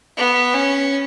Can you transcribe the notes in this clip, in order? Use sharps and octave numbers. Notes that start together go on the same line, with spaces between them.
B3
C#4